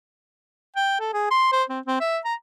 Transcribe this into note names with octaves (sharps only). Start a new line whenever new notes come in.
G5
A4
G#4
C6
C5
C4
C4
E5
A#5